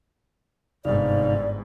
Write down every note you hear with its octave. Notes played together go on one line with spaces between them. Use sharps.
G1 G#2 C3 D#4 D5 F5